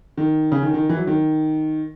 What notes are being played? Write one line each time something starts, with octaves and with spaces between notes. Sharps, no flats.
D#3
C#3
D#3
D#3
E3
F#3
D#3